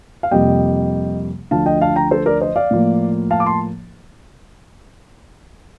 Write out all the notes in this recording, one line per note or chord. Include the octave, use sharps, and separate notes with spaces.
F5
F2 C3 G3 A#3 D#5 G5
D2 D3 F3 F5 A5
D#5 G5
F5 A5
G5 A#5
A4 C5
A#4 D5
C5 D#5
D5 F5
A2 F3 A#3
F5 A5
D6
A5 C6